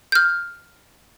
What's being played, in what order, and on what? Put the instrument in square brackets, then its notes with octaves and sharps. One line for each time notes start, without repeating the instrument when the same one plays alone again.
[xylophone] F6 G6